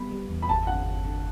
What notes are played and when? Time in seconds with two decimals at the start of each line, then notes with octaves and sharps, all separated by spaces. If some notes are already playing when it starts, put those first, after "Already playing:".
Already playing: G3 B3 B5
0.11 G3
0.30 E2
0.42 B5
0.49 G1 A5
0.67 D3 F#5
0.86 G1
1.04 D3